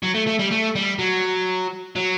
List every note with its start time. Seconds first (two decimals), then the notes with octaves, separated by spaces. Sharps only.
0.02 F#3
0.14 A3
0.27 A3
0.39 G3
0.51 A3
0.75 G3
0.99 F#3
1.96 F#3